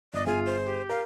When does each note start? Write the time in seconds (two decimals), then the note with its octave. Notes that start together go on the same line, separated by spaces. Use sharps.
0.14 G1 D5 D#5
0.26 G1 F4 G#4 G#5
0.46 C5
0.65 G4
0.89 A#4 F5